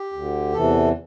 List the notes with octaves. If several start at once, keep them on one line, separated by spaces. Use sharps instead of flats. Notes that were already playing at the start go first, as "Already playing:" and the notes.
Already playing: G4
D2 D3
E2 C3 E3 A4